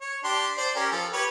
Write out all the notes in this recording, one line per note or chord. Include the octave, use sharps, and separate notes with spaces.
C#5
D4 G4 C6
C5 D5
C#4 G4 A#4
F3 A4
G4 B4 C#5